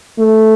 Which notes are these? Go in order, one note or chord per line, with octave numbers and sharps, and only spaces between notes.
A3